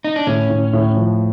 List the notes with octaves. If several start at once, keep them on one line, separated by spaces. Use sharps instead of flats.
D#4
D4
A2 C#4
A2
A2
F3